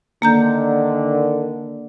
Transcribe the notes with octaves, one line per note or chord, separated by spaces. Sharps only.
D3 D#3 A#3 A#5 G6